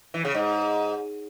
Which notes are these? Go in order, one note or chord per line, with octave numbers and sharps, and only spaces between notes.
E3
C#3
G#2